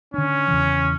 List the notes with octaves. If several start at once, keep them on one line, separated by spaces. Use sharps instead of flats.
D3 C#4 D4
E2 C#3 E3